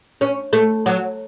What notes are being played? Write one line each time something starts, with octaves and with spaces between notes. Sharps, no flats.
C#4
A3
F#3